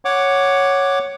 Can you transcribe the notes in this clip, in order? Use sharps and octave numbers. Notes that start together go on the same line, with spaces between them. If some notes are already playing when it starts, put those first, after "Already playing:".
C#5 F#5 D6